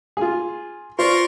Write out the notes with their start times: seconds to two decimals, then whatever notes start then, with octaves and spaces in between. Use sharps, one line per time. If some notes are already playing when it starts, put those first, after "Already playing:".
0.17 F4 G#4
0.99 F4 A#4 C5 D5 C6 C#6